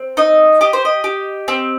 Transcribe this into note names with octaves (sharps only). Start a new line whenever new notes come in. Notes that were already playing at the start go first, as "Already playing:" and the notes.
Already playing: C4
D#4 D#5
G4 D#5
C5
D#5
G4
C4